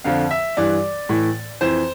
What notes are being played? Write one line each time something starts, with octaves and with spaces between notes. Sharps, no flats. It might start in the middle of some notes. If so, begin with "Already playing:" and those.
F2 D3 F3 F5
E5
G2 E3 D5
A2 E3
F2 E3 C5